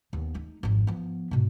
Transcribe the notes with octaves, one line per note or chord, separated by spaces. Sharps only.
D#2 B3
A3 D#4
G#1 F2
F3 B3
G#2 B2